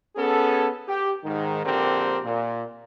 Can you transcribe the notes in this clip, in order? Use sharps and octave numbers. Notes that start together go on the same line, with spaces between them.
B3 C#4 G#4 A4
G4
G#2 D#3
A#1 D3 C4 G4 A#4
A#2